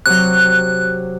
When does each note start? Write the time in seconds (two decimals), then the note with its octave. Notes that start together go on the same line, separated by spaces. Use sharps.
0.06 C3 F#3 F#6